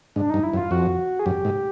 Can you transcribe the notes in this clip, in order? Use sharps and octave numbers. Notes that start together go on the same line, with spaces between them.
G#2 D4
G2 D#4
E4
F#2
F4
F2 F#4
G#4
F#2 G4
G#2